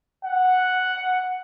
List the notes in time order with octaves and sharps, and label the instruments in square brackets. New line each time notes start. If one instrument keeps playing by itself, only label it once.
[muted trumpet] F#5